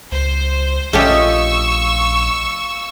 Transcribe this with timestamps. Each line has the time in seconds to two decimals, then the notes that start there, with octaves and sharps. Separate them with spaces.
0.12 C#2 C5
0.93 A#1 A3 C#4 F4 G4 D#5 C#6 E6